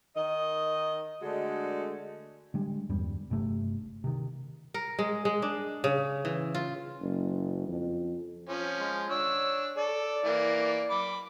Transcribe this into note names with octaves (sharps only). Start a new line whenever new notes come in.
D#3 D#5
D3 G#3 A3 D4 F#4
D3 G3 G#3
E2 G2 G3
G1 G2 C3 A3
C3 D#3
A#4
G#3
G#3
D4
C#3
E3
F4
F#1
F2
F3 C#4
G#3
D4 C#5 E6
A4 D5
E3 A#3
B5 D6